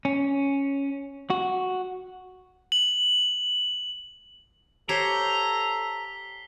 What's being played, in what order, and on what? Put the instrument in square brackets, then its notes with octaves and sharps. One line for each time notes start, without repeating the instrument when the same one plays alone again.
[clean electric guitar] C#4
F#4
[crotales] F#7
[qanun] G4 C5 C#5 [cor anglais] A4 [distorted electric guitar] A#5 [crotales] B6 C7 G7